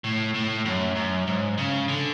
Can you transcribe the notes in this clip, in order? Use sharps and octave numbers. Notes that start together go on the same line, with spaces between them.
A2
A2
F#2
F#2
G#2
C#3
D3